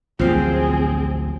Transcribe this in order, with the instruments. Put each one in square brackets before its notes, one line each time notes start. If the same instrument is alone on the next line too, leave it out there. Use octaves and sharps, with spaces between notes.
[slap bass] A1 D2 F#3 [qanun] F3 F5 [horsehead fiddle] C4 G#4